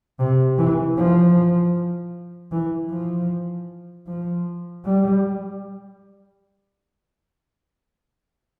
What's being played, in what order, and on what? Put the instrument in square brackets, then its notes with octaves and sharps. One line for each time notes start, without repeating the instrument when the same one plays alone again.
[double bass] C3
E3
F3
E3
F3
F3
G3